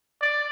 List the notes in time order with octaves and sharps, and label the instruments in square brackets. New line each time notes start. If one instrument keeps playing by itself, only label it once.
[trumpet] D5